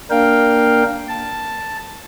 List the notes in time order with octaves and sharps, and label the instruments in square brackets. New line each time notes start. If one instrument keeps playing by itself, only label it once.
[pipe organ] A#3 D4 A#4 F5 G5
A5